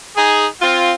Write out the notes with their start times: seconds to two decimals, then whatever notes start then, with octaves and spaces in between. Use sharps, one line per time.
0.16 D#4 G#4
0.62 C4 F4